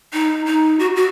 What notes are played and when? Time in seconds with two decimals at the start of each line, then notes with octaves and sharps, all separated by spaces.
0.13 D#4
0.46 D#4
0.79 F#4
0.96 F#4